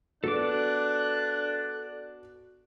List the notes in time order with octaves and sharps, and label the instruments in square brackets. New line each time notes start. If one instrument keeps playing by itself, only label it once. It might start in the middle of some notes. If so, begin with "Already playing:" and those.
[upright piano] B3 F#4 [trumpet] D4 [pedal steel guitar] A4 D6 [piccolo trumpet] F#6